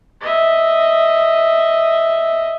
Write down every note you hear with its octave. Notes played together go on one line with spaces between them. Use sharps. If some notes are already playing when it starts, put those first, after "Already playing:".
D#5 E5